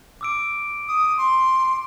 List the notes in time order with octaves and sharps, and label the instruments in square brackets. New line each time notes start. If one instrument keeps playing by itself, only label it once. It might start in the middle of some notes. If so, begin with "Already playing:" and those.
[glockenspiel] D6 E6 D7
[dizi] D#6
C6